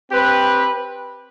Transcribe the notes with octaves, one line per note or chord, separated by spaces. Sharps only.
C4 G4 B4